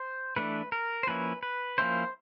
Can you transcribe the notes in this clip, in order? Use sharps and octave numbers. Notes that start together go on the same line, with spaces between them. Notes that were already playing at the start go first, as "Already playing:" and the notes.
Already playing: C5
E3 A3 D4 B4
A#4
C5
F3 A#3 C#4 E4 B4
B4
F3 A#3 C#4 E4 C5